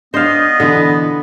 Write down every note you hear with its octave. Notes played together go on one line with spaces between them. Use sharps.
B3 D4 C5 D#5 F5
B2 D3 E3